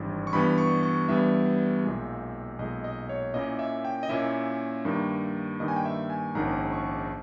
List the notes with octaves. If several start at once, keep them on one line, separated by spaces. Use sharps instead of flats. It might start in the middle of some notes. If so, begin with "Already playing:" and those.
Already playing: G#1 G2 E3
C#6
G2 E3 G3 B3 B5
C#6
C#6
G2 E3 G3 B3 E5
B1 A#2 G#3
B1 A#2 G#3 D#5
D#5
C#5
A#2 A#3 C#4 E4 D#5
E5
G5
D#5
A#2 A#3 C#4 E4 E5
G2 D#3 A#3
G2 D#3 A#3 D#5
G#5
G5
E5
G#5
A#1 G#2 D#3 A#3 C#4 A#5
C#6